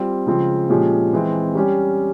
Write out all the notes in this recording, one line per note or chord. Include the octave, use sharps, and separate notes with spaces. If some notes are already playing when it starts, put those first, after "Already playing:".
Already playing: G3 C4 F4
C#3 F3 G#3 C4 F4
A#2 F3 G#3 C#4 G4
E3 G#3 C4
G3 C#4 G4